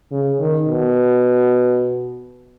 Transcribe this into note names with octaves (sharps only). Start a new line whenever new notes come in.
C#3
D#3
B2